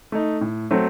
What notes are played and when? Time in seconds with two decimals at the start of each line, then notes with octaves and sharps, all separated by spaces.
0.12 A3 D#4
0.41 A2
0.71 F#3 A3 C4